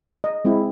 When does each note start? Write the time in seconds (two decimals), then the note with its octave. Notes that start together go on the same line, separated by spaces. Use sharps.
0.24 D#5
0.45 G#3 C4 E4